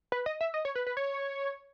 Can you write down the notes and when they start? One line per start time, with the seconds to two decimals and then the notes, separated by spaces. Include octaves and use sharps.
0.12 B4
0.26 D#5
0.41 E5
0.54 D#5
0.65 C#5
0.75 B4
0.87 B4
0.97 C#5